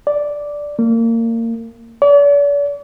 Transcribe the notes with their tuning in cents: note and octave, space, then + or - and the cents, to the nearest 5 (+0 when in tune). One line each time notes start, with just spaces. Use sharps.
D5 -5
A#3 -25
D5 -45